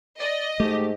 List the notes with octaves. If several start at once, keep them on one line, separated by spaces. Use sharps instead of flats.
D5 D#5
G#2 A3 G4